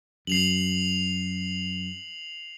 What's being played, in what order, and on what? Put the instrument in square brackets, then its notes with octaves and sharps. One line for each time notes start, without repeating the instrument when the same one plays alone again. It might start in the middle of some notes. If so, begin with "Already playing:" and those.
[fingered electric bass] F#2 [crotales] C7 F7 F#7